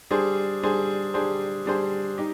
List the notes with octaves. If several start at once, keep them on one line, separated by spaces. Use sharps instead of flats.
G3 D4 G#4 C5
G3 D4 G#4 C5
G3 D4 G#4 C5
G3 D4 G#4 C5
D#4 G4